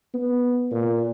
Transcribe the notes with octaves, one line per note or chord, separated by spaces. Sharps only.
B3
A#2